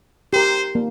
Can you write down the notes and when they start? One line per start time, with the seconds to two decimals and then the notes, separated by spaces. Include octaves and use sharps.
0.33 G4 A#4 C5
0.75 A#3